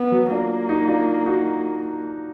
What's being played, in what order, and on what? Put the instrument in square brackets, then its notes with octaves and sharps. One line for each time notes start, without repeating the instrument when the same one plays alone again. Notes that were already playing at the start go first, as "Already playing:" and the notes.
Already playing: [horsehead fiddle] B3
[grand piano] F#3
[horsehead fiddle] A#3 [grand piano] D4 F4
[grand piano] D#4 F#4
D4 F4
D#4 F#4